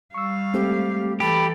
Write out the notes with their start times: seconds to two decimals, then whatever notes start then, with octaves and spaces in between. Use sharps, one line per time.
0.14 G3 F5 C#6 E6
0.54 G#3 A3 C4 G4
1.20 E3 G4 A4 B5